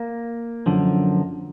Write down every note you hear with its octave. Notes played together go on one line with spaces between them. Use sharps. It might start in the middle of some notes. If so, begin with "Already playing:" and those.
Already playing: A#3
F#2 D3 F3